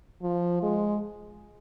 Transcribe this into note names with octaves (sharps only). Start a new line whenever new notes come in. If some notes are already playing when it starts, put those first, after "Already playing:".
F3
G#3